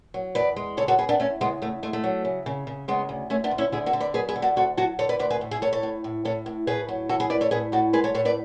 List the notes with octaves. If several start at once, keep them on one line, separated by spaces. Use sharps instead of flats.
F#3
E2 B4 D5
G#3
C#3 A4 C#5
F#4 A4
C#3 G#4 B4
B3 D4
E2 A3 C#4
C#3 G#3 B3
E2 A3
G#3 A3
A3
F#3
C#3
C#3
C#3
C#3 G#3 B3
D2
D2 A3 C#4
B3 D4
D2
C#4 E4
D3 E4 G#4
F#4 A4
D3
B4 D5
F#3 G#4 B4
G#4 B4
D3
F#4 A4
D2 F#4 A4
F#3 F#4 A4
D3 A4 C#5
B4 D5
D2 B4 D5
G#4 B4
A2
E4 G#4
A2 A4 C#5
A4 C#5
A2
A2
A2 A4 C#5
A2
A2 G#4 B4
F#3
E3 F#4 A4
G#4 B4
A2 B4 D5
A4 C#5
A2 G#4 B4
A2 F#4 A4
G#3 G#4 B4
A4 C#5
A2 A4 C#5
B4 D5